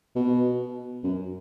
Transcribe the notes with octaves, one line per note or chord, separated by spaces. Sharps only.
B2
F#2